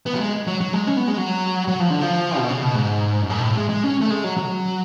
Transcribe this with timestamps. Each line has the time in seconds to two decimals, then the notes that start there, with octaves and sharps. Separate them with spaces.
0.06 B3
0.14 F#3
0.20 G#3
0.47 F#3
0.61 F#3
0.73 G#3
0.87 C#4
0.97 B3
1.07 G#3
1.17 F#3
1.68 F#3
1.80 F3
1.90 D3
2.01 F3
2.38 B2
2.49 C#3
2.63 B2
2.75 G#2
3.22 F#2
3.30 G#2
3.38 B2
3.43 A2
3.57 G#3
3.70 G#3
3.84 C#4
4.01 A3
4.10 G#3
4.24 F#3
4.37 F#3